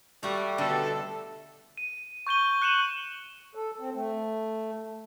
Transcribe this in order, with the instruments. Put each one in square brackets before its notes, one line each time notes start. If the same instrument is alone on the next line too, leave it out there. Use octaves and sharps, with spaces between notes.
[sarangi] G3 [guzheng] A3 F#4
[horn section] B2 A4 [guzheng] D3
[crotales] D#7
C#6 G6 D#7 G7
F#6 C#7 D#7 E7 F#7
[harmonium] A4
C4
A3